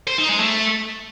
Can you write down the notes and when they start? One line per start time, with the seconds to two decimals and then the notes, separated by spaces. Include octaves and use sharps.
0.08 C5
0.18 D#4
0.29 G#3
0.40 A3